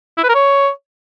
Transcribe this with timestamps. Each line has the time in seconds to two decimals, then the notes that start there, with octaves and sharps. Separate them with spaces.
0.18 E4
0.23 B4
0.29 A#4
0.35 C#5